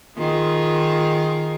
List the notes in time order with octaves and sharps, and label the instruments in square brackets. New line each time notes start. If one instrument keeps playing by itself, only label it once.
[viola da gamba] D#3 F4 G#4